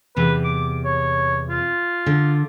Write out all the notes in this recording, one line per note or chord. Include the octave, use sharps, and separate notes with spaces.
E2 C3 B4
D6
C#5
F4
D3